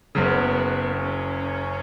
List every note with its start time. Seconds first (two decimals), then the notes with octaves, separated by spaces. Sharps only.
0.15 F#1 F#2 C#3 B3
0.94 C#4